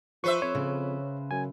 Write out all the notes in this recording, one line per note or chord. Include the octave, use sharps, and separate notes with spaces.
F3 B4 C5 E5 C#6
F2 C#5
C#3
F#2 G#5